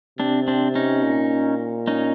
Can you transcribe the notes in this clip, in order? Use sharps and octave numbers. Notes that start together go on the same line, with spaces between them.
C3 C4 D4
C4 D4
C#4 D#4
A#2
C#4 D#4